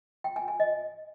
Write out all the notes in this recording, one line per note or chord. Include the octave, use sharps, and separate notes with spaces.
G5
G#5
G#5
D#5